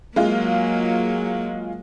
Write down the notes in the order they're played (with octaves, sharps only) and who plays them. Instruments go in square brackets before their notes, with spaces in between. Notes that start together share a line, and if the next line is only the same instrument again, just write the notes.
[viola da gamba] F#3 A#3 [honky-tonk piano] G#3 F4